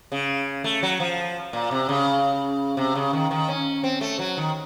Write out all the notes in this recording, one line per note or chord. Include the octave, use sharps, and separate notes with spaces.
C#3
A3
F#3
F3
A#2
C3
C#3
C3
C#3
D#3
D#3
C#4
C4
A3
F#3
D#3